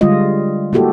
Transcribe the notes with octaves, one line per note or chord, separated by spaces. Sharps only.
D3 G3 G#3 F4 D#5
A#3 E4 F#4 G4 A4